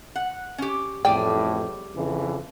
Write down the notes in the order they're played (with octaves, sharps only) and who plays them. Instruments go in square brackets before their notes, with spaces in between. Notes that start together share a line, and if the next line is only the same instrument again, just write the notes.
[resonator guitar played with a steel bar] F#5
C#4 G4
[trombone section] A1 F2 A2 [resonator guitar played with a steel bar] G3 G#4 D5 [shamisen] G5
[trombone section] F2 C#3 E3